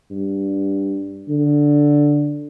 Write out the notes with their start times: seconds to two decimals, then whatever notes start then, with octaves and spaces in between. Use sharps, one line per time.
0.11 G2
1.29 D3